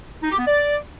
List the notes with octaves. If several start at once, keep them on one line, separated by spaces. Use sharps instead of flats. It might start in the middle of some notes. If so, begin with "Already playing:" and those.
D#4
G4
B3
D5